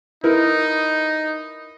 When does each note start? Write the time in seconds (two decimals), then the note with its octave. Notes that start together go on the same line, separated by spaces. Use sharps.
0.24 D#4 E4 A#4 B4